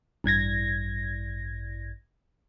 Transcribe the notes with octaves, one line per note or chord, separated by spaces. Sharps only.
A1 G2 G#6 A#6